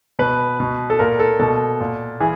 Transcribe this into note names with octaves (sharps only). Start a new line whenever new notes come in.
B2 B4
B2
A4
A#2 A#4
A4
B2 A4
A#2
E3 G#4